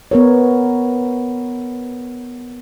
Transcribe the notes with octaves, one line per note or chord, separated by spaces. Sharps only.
B3 A#4 C#5